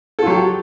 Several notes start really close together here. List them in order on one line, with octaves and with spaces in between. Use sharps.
A4 F4 F#3 G4